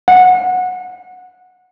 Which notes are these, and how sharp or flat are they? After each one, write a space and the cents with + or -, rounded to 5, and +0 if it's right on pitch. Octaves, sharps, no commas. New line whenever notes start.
F#5 -15